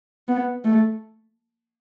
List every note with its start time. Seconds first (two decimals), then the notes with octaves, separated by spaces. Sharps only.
0.28 B3
0.64 A3